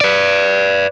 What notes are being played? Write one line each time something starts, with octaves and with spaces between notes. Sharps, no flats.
B4 D5